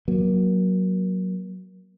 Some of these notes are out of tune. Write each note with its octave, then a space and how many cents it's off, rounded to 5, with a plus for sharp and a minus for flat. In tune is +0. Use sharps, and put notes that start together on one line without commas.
F#3 +0 A#3 +25